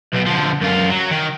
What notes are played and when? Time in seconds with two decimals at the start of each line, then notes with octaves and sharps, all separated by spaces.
0.13 B1 B2
0.26 D3 F3
0.62 F#2 F4
0.90 F#3
1.11 D#3